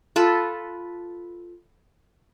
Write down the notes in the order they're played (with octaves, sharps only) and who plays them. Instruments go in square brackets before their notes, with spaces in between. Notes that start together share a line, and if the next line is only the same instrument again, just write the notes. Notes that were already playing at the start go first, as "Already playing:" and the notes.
[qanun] F4 A4 B4